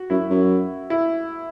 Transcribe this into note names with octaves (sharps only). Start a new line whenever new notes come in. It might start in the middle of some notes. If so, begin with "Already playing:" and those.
Already playing: F#4
F#2 E4
F#2
E4